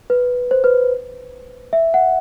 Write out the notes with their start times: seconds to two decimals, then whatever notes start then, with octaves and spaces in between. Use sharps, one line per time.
0.10 B4
0.51 C5
0.64 B4
1.73 E5
1.94 F#5